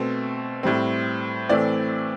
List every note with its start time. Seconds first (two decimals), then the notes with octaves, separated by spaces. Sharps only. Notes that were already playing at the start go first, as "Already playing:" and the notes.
Already playing: B2 A3 C4 C5
0.63 A2 G3 C4
1.49 A2 E3 A3 C4 D5